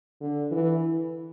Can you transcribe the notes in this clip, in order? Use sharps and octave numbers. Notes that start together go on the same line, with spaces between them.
D3
E3